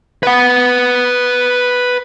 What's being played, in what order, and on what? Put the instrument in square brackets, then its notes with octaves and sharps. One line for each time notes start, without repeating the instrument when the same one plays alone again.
[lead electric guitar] B4 F#5